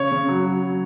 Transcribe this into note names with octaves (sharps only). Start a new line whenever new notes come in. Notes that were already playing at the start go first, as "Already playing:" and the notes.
Already playing: C#3 C#5
C#3
F#3
F#3
F#3